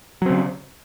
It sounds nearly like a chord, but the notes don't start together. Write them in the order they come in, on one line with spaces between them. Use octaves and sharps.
F#3 C4 C#3